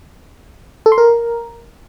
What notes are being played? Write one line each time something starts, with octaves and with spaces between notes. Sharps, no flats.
A4
C6
A#4